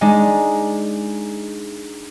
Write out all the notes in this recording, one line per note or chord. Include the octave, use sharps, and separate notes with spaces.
G#3 D4 D#4